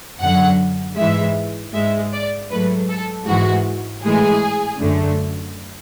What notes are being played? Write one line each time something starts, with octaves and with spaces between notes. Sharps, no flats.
F#2 D3 F#3 F#5
G#2 E3 G#3 E5
G#2 G#3 E5
D5
G#2 F#3 A3 B4
A4
G#2 E3 G#3 F#4
A2 E3 G#3 G#4
F#2 D3 A3